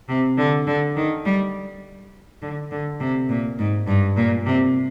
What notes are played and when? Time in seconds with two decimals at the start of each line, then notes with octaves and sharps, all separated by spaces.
0.09 C3
0.38 D3
0.67 D3
0.96 D#3
1.25 G3
2.42 D3
2.71 D3
3.00 C3
3.29 A#2
3.59 G#2
3.87 G2
4.16 A#2
4.46 C3